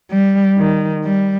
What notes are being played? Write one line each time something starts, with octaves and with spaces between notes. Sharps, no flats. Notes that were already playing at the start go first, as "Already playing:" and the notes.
G3
D#3
G3